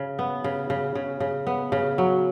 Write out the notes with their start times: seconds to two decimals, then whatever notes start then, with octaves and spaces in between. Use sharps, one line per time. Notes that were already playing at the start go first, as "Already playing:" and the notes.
Already playing: C#3
0.19 B3
0.44 C#3
0.70 C#3
0.95 C#3
1.20 C#3
1.47 B3
1.72 C#3
1.98 F#3